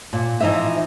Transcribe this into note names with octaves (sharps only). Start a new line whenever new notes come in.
A#2
E3 F3 D#4 C5 E5